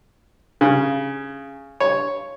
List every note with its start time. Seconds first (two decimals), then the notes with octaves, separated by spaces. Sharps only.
0.61 C#3
1.80 C#5